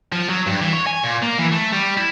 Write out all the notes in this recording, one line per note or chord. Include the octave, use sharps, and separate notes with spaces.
F3
F#3
G2
E3
C#5
G#5
A#2
A#3
E3
A3
G3
E4